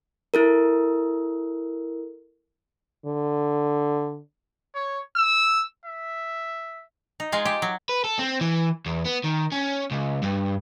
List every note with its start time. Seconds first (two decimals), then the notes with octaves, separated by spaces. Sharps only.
0.34 E4 A4 A#4
3.06 D3
4.74 C#5
5.16 E6
5.85 E5
7.20 D#4
7.32 G#3 F4 G#4
7.45 G4
7.62 F#3
7.89 B4
8.04 A4
8.19 C4
8.41 E3
8.86 E2
9.06 B3
9.24 D#3
9.52 C#4
9.91 C#2
10.22 G2